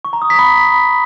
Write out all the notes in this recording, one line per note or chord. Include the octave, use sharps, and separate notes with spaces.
C#6
A#5
D#6
B6
B5